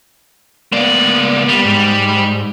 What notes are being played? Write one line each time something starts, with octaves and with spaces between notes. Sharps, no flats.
C#2 A#3 B3 D5
G3
G#2